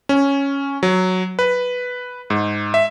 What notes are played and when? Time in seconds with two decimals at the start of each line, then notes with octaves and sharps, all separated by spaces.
0.09 C#4
0.83 F#3
1.39 B4
2.30 G#2
2.74 E5